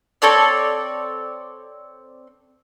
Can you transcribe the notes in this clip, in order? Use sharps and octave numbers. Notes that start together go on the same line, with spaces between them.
C4 A4 C#5 D5